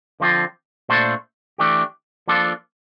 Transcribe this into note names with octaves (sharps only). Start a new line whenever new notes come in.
D3 F3 C4 F4
A#2 A3 D4 A4 C5
E3 A3 D4 G4
F3 A#3 D4 F4 A4